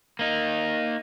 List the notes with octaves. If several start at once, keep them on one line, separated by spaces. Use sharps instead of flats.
A#3 D#4